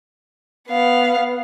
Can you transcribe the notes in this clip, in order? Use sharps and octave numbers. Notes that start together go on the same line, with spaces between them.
B3 F5